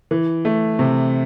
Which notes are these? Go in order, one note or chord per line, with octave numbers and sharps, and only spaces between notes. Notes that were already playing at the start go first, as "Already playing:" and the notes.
E3
A3
C3